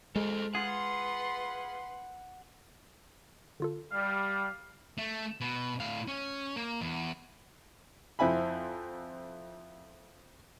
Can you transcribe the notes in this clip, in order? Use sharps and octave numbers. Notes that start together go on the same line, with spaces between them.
G#3 A4 C5
F4 G#4 B4 F#5 C6
D3 F4 A4
G3 F5
A3
B2
A2 F5
C#4
A#3
E2
F2 C4 E4 G#5 B5